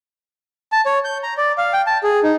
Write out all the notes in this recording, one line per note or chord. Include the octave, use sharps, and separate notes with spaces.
A5
C#5
G6
A#5
D5
F5
G5
A5
G#4
D#4